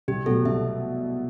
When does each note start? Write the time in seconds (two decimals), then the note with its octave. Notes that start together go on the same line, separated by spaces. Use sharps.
0.08 C2 G4
0.26 B2 F#3 A3 A4
0.45 C2 E5